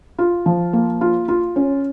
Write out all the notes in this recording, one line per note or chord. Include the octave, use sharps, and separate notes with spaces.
F4
F3
A#3
F4
F4
C#4